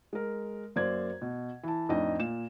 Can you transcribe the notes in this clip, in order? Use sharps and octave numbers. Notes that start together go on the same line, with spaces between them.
G#3 A#4
F#2 A#3 C5 D5 G#6
B2
E3 A5
F2 A2 D4 D#4 D#5
A#2 E7